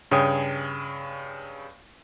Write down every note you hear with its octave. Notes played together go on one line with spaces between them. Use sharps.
G2 C#3 G#4 C#5 G5 D#6